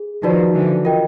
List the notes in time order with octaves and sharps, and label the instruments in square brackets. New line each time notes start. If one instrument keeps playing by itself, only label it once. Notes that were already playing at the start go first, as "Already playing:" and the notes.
Already playing: [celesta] G#4
[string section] D#3 F3 [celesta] D#4 F#4 B4 D5
[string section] D3 E3
[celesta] F4 A#4 D#5 G5